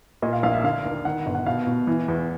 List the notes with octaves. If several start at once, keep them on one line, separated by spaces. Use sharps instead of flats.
A#2 D#5
F5
A#1 F5
E5
D3 F5
D#2
D#3 F#5
G1
F#5
B2 F5
B2
E3
E2